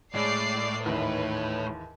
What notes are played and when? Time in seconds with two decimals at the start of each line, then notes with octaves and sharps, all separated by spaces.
0.14 A2 G#3 D5 C7
0.86 D#2 G#2 E3 B4